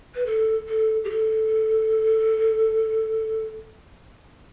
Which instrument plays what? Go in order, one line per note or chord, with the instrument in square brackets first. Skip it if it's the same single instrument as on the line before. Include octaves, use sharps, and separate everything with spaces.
[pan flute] B4
A4
A4
G4
A4